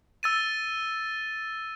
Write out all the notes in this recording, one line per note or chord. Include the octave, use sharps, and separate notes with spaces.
E6 A6 D#7